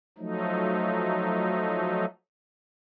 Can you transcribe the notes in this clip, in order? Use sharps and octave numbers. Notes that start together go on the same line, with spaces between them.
F3 F#3 A3 D#4